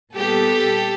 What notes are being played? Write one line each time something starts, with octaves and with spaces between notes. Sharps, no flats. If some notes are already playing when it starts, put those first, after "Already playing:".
A#2 G3 B3 G4 A4